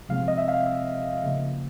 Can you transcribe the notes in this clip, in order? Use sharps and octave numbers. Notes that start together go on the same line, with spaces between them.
C3 F3 G#3 C4 F5
D#5
E5
F5
E5
C#3 F3 A#3